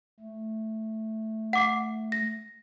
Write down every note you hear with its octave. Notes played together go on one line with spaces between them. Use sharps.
A3
F#5 D6 C7
A#6